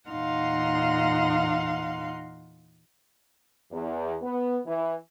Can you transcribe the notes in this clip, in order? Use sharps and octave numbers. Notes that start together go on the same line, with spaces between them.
E2 A#2 D#4 F5 F#5 C6
E2
B3
E3